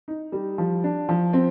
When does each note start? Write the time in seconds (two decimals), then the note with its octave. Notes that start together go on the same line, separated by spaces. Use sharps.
0.08 D#4
0.32 G3
0.58 F3
0.84 D4
1.09 F3
1.33 C4